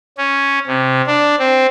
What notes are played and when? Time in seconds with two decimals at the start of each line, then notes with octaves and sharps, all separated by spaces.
0.18 C#4
0.67 C3
1.07 D4
1.39 C4